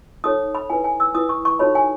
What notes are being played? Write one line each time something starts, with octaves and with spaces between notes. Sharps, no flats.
D#4 A4 C#5 D#6
B5
E4 B4 G#5
G#5
E6
E4 B4 D#6
C#6
C#6
D#4 F#4 A4 C#5 B5
G#5